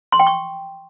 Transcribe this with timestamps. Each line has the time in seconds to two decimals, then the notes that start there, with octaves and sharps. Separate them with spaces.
0.12 C6
0.20 G5
0.27 C#6